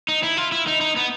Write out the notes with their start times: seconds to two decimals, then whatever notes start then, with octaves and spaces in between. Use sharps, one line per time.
0.08 D#4
0.23 E4
0.37 F4
0.52 E4
0.67 D#4
0.81 D#4
0.96 B3